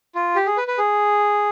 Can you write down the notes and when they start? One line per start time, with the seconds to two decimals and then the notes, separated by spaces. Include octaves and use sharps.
0.15 F4
0.36 G4
0.46 G#4
0.57 B4
0.68 B4
0.78 G#4